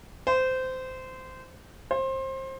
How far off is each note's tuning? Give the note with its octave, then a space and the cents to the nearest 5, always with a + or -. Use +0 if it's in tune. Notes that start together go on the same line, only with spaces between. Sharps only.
C5 -20
C5 +25